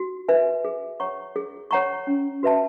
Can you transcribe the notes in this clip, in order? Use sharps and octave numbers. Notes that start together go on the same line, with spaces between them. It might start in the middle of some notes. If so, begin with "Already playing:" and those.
Already playing: F#4
B4 E5 G#5
G#4
C#5 F#5 A#5 C#6
G#4
C#5 F#5 A#5 C#6
C#4
F#4 B4 E5 A5